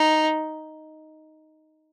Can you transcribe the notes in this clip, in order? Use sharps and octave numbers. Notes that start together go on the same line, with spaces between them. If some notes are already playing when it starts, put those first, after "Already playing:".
Already playing: D#4